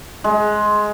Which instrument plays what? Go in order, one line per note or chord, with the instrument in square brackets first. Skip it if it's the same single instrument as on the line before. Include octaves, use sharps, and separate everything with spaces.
[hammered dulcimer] G#3